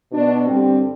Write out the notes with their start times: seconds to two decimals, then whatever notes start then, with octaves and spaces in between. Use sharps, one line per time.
0.12 B2 B3 D4
0.45 G2 D3 G3 C4